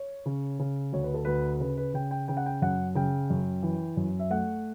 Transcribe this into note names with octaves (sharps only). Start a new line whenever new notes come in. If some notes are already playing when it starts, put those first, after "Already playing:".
Already playing: C#5
C#3
C#3
D2 C#5
B4
A4
D2 B4
C#3 B4
B4
C#3 G5
G5
C#3 G5
F#5
G5
F#2 F#5
C#3 G5
F#2
E3
F#2
E5
A3 F#5